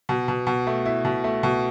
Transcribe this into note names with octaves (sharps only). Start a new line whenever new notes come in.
B2
B2
B2
A3
E4
B2
A3
B2